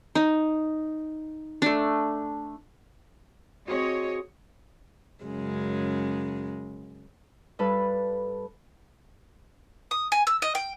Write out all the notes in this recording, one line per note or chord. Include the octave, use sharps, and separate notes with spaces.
D#4
A3 D4
C4 F#4 G#4 C#5 D#5
F#2 C#3 G#3
G2 A4 B4
D#6
G#5
E6
D#5
G5